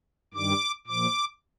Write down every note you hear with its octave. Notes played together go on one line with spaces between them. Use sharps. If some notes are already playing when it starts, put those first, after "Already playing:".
G2 D#3 G3 D6
A#2 F3 D6